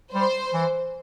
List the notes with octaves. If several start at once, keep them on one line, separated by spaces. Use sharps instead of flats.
G3 C5
E3